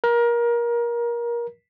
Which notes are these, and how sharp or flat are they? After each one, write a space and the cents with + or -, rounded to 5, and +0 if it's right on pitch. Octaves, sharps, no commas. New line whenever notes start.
A#4 +25